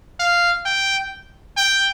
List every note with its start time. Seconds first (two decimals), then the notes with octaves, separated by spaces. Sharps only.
0.20 F5
0.66 G5
1.57 G5